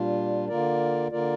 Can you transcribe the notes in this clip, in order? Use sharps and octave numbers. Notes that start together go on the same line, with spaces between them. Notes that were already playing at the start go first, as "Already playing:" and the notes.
Already playing: A#2 G3 D4 F4
D3 A#3 F4 A#4 D5
D3 A#3 F4 A#4 D5